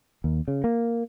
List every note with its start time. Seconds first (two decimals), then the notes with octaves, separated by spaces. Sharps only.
0.24 D#2
0.48 C#3
0.64 A#3